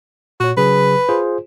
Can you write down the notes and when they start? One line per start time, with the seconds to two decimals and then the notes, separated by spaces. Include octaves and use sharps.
0.40 A#2 F#4 C#5
0.57 C#3 F#3 G#4 B4
1.09 F4 G#4 C5